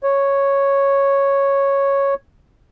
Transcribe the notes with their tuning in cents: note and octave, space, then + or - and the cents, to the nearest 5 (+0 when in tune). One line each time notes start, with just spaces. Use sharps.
C#5 -5